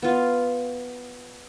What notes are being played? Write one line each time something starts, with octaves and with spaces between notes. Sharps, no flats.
B3 F4